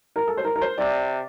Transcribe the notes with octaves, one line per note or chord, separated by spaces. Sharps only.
A#4
A4
C5
A#4
A#4
C5
C3 D5